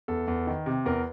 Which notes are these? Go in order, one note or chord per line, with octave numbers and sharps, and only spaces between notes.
E2 A4
E2
D#3
C3
E2 A#4